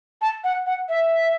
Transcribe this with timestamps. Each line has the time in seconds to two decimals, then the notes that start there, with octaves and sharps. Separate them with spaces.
0.22 A5
0.44 F#5
0.66 F#5
0.89 E5